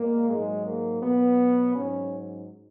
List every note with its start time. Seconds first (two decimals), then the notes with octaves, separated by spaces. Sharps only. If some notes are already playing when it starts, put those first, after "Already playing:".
Already playing: A#2 G#3 A#3
0.30 G#2 F#3 G#3
0.65 A#3
1.02 B2 F#3 B3
1.75 G#2 F#3 C#4